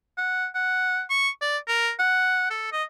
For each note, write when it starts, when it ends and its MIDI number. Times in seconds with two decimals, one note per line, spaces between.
0.18 0.47 78
0.55 1.01 78
1.10 1.29 85
1.41 1.58 74
1.68 1.91 70
1.99 2.46 78
2.50 2.68 69
2.72 2.83 75